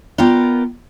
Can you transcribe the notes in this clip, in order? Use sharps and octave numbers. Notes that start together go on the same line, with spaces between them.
B3 F4 A#4 D5 G5